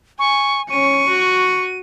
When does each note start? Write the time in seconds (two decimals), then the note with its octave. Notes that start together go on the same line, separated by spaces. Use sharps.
0.19 G#5 C#6
0.71 C#4 C#6 D#7
1.08 F#4